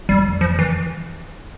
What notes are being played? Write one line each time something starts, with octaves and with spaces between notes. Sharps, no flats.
F2 G3
F3
E3